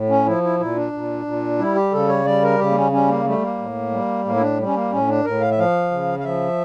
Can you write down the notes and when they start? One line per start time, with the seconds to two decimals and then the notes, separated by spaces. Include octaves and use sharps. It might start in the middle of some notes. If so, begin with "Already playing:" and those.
Already playing: A2
0.09 C#4
0.26 F3 E4
0.43 E4
0.60 A#2 E4
0.76 D4
0.93 A#2
1.26 A#2
1.59 G3 E4
1.75 G4
1.92 C#3 A4
2.08 C#5
2.25 G3 D5
2.43 A#4
2.59 C#3 G4
2.71 A#3
2.76 C#4
2.91 G3 C#4
3.08 A#3
3.25 G3 A3
3.42 A#3
3.59 A2
3.91 G3
4.25 A2 A#3
4.35 E4
4.41 D4
4.59 G3
4.66 C#4
4.74 A#3
4.92 A2 C#4
5.08 D4
5.25 A2 A#4
5.41 F5
5.51 E5
5.58 F3 F5
5.91 C#3
6.20 F5
6.24 F3 E5